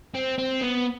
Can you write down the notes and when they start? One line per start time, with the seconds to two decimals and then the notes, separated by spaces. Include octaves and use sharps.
0.15 C4
0.38 C4
0.61 B3